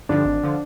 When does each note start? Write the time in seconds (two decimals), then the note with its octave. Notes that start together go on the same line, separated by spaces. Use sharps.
0.09 G2 D3 F3 D4
0.25 G#1
0.43 D3 F3